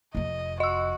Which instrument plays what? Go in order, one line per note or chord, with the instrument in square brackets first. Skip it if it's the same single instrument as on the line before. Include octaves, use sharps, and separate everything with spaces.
[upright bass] F1 F2 [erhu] D#5
[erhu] F#4 [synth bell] D#5 E6